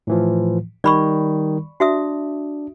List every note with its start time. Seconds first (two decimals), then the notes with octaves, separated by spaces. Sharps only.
0.07 A2 E3 F3
0.84 D#3 G3 D5 B5 C#6
1.80 D4 F#4 E5 D#6